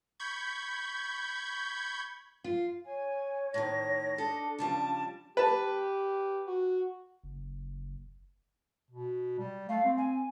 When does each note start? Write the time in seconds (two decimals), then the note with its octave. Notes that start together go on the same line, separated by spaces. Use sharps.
0.20 B5 C#6 G6 G#6
2.44 F4
2.85 C#5 G#5
3.54 A2 D#3 A#6
4.18 D4 A4 D#5
4.59 C#3 F3 G3 A5
5.37 G4 B4 A5
6.47 F#4
7.24 F#1
8.91 B2
9.39 G3
9.69 A3 F5
9.84 C4
9.97 G#5